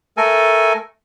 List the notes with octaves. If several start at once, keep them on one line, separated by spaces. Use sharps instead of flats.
A3 A4 A#4 G#5